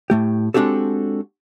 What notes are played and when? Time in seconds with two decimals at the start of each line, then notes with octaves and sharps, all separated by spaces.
0.10 A2 A3 G4
0.54 G#3 C4 D4 F#4 G4 A4